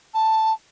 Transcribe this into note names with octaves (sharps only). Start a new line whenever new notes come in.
A5